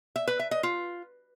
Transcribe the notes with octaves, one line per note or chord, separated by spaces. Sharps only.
E5
B4
E5
D#5
F4